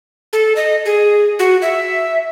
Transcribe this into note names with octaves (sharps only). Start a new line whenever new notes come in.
A4
D#5
G#4
F#4
E5